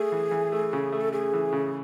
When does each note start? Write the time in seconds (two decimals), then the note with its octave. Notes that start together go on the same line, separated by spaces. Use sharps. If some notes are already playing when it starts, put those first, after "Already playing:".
Already playing: A3 G#4
0.12 E3
0.31 E3
0.52 A3
0.73 C#3
0.92 A3
1.01 A4
1.12 A3 G#4
1.33 E3
1.53 C#3